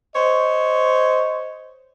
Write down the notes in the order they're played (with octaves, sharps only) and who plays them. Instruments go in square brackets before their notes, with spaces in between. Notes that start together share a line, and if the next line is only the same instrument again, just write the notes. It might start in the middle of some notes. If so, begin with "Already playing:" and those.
[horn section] C5 C#5 D#5